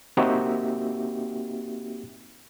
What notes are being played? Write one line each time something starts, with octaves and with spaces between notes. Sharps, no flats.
A#3 C4 D#4 F#4 G4 E5